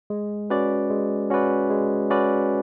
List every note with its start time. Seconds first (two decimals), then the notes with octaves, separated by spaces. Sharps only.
0.10 G#3
0.50 C#4 F#4 B4 D5
0.90 G#3
1.30 C#4 F#4 B4 D5
1.70 G#3
2.10 C#4 F#4 B4 D5